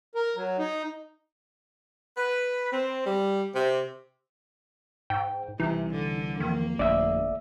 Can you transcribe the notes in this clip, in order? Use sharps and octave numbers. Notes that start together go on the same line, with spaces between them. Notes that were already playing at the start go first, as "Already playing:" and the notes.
A#4
F#3
D#4
B4
C4
G3
C3
G#2 G5
C2 C3 E3 D#4
D3
E2 D#3 F3 A#3
G1 F2 A3 D4 D5 E5